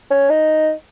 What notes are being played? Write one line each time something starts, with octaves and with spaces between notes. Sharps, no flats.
C#4
D#4